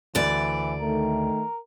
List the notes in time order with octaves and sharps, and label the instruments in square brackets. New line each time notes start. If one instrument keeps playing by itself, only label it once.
[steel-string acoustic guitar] D2 D5 [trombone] E3
[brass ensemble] D#3 A3 [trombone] A#4